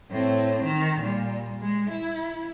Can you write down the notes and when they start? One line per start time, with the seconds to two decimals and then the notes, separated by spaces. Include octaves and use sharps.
0.10 A2 C4
0.63 D#3
1.01 A#2 G3
1.61 G#3
1.91 E4